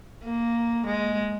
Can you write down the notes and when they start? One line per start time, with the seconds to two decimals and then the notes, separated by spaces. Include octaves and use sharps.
0.24 A#3
0.87 G#3